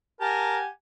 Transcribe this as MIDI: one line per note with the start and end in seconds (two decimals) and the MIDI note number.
0.21 0.68 67
0.21 0.57 70
0.21 0.68 78
0.21 0.68 80
0.21 0.57 81